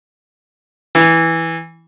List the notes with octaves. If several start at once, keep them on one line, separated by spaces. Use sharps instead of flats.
E3